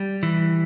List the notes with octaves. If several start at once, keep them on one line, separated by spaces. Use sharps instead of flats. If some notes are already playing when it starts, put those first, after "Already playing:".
Already playing: G3
E3